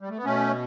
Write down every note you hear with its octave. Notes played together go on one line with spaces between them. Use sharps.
G3
A3
B3
B2 A3 C#4